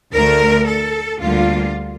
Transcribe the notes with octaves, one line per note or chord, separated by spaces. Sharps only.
D2 D3 A3 A#4
A4
D2 D3 G3 A#3 F4